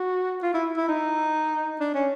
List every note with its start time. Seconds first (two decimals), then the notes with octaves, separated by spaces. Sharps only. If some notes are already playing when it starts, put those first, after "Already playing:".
Already playing: F#4
0.42 F4
0.54 E4
0.77 E4
0.88 D#4
1.80 D4
1.95 C#4